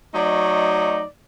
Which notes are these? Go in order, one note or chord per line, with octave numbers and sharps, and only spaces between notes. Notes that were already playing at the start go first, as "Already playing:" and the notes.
F#3 A3 D#4 D5 D#5